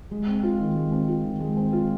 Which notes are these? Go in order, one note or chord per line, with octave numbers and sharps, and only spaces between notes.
G#3
C4
F4
D#3
G#3
C4
F4
D#3
G#3
C4
F4